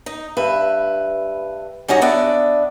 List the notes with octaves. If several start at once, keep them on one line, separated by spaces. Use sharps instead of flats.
D#4
G2 B4 E5
G3 C#4 D#4 F#4
B3 D4 D5 E5